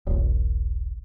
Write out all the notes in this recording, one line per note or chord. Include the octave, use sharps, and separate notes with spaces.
D#1 A#1